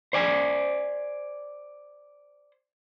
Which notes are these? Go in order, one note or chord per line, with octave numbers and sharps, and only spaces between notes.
C5 D5 G#5